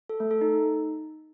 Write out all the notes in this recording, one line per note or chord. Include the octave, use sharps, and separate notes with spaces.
A4
A3
A4
D#4